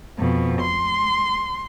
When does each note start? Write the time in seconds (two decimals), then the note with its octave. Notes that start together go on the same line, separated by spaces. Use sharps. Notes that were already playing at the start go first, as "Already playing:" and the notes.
0.20 F2 B2
0.61 C6